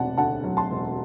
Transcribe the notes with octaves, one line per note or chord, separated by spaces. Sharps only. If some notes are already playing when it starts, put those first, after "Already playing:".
Already playing: E1 C3 F#3 D5 F#5 A5
D2 F#5 A5
F#3
A5 C6
E1